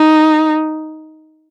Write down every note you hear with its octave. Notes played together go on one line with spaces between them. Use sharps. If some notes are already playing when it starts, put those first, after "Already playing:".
Already playing: D#4